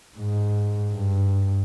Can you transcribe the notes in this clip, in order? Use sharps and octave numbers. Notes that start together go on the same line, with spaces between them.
G#2
G2